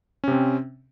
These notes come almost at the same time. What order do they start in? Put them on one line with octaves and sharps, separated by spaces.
C#4 C3 C4